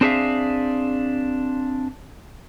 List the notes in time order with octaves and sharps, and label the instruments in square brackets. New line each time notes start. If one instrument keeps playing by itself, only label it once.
[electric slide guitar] C4 D4 G#4 C#5 E5 F5